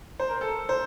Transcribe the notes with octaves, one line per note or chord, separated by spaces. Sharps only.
C5
A#4
A4
C5